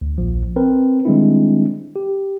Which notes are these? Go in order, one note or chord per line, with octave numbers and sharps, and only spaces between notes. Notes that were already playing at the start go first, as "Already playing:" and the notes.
D2
A#1 F3
C4 A#4 B4
D#3 G3 G#3 C4 D4 E4
G4